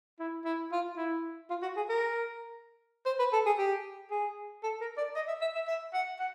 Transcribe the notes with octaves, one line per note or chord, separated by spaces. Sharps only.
E4
E4
F4
E4
F4
F#4
G#4
A#4
C5
B4
A4
G#4
G4
G#4
A4
A#4
D5
D#5
E5
E5
E5
E5
F#5
F#5